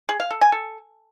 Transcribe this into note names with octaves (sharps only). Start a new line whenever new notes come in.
G#4
F5
A4
G#5
A4